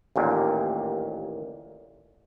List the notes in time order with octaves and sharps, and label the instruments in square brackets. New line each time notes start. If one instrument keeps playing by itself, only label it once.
[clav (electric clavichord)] A1 D#2 A#2